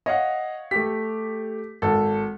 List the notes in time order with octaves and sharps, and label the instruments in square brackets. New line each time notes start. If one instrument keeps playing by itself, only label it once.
[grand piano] C#5 F5 F#5 [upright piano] D#5
[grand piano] A3 G4 [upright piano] B6
[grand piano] G#1 [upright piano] A4